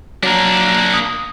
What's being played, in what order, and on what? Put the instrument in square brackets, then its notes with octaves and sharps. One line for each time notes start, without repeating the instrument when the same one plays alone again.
[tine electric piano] F#3 A#5 [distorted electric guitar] A#3 D4
[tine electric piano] D#6